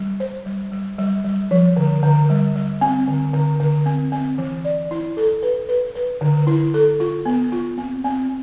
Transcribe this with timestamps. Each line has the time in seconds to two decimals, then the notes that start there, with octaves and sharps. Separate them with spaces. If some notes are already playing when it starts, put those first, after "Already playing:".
Already playing: G3
0.20 C5
0.46 G3
0.72 G3
0.99 G3
1.24 G3
1.51 F3
1.77 D3
2.03 D3
2.30 G3
2.56 G3
2.81 C4
3.08 D3
3.33 D3
3.60 D3
3.86 C4
4.12 C4
4.38 E3
4.65 D5
4.91 E4
5.17 A4
5.43 B4
5.69 B4
5.95 B4
6.21 D3
6.47 E4
6.74 A4
7.00 F4
7.26 B3
7.52 F4
7.78 C4
8.04 C4